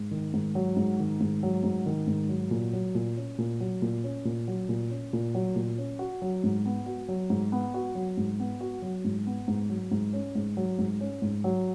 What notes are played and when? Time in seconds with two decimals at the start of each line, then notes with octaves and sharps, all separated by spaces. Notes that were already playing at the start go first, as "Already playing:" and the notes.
Already playing: G#2
0.11 D#3
0.34 G#2
0.55 F#3
0.76 G#2
0.99 D#3
1.21 G#2
1.43 F#3
1.64 G#2
1.86 D#3
2.07 G#2
2.29 F#3
2.51 A#2
2.73 F#3
2.95 A#2
3.17 C#4
3.38 A#2
3.60 F#3
3.82 A#2
4.04 C#4
4.25 A#2
4.48 F#3
4.69 A#2
4.90 C#4
5.13 A#2
5.35 F#3
5.56 A#2
5.78 C#4
5.99 F#4
6.22 F#3
6.44 G#2
6.65 B3
6.86 F#4
7.08 F#3
7.30 G#2
7.52 B3
7.74 F#4
7.95 F#3
8.17 G#2
8.40 B3
8.61 F#4
8.82 F#3
9.04 G#2
9.26 B3
9.48 G#2
9.69 F#3
9.91 G#2
10.13 C#4
10.35 G#2
10.57 F#3
10.78 G#2
11.01 C#4
11.22 G#2
11.44 F#3